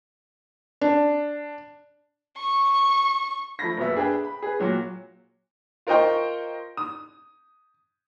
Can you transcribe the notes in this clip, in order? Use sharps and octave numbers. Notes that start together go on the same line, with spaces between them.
D4
C#6
F3 A3 B5 A#6
F#1 B2 B3 E5
D4 G#4 B4 G5
B5
G#4 B4
A#2 F#3 F#4
F4 A#4 C5 D#5 G5 C#6
D#6